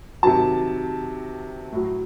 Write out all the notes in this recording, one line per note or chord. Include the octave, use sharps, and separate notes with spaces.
C3 D#3 F#3 A5
A2 F#3